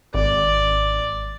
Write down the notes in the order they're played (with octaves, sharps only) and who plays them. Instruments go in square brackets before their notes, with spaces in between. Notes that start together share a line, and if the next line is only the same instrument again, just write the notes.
[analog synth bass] G#1 [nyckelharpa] D5